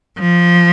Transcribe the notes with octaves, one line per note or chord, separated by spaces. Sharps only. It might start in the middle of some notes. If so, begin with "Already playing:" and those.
F3